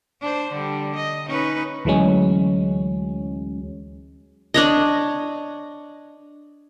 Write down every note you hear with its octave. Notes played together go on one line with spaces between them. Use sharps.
D4 C5
D3 G3
D#5
C#4 D#4 B4
D2 E3 F#3 G#3 C#4
D4 C#5 D#5